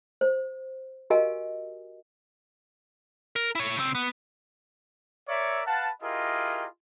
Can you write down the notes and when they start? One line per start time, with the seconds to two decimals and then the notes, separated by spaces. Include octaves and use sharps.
0.21 C5
1.10 F#4 G4 A#4 D#5 F5 G#5
3.36 A#4
3.55 E4 C#5
3.75 C#3 C4
3.95 B3
5.28 A#4 C#5 D5 E5
5.66 B4 F5 F#5 A5
6.02 E4 F4 G4 G#4 A#4 D#5